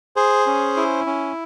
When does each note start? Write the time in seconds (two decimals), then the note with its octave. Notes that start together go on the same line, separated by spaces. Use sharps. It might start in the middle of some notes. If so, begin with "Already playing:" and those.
0.16 G#4 C5
0.47 C#4
0.77 E4
1.07 C#4